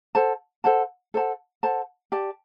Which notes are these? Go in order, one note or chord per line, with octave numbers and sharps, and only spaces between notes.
A4 C5 F#5 A5
A4 C5 F#5 A5
A4 C5 F#5 A5
A4 C5 F#5 A5
G4 D5 A5